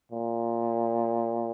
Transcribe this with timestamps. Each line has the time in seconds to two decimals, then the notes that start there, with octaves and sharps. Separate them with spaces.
0.12 A#2